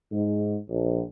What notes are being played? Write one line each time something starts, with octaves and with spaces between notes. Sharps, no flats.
G#2
A#1